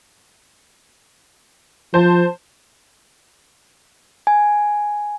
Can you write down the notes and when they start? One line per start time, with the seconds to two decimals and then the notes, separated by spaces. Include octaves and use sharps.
1.94 F3 C5 A5
4.27 G#5